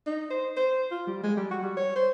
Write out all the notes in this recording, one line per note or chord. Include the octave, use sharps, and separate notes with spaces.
D#4
C5
C5
F4
G3
G#3
G3
F#4
G3
C#5
C5